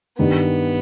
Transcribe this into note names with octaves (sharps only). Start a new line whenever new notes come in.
G2 D#3 G3 B3